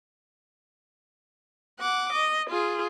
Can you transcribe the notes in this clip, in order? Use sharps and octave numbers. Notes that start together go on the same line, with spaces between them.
F#5 D6
D#5
F4 G#4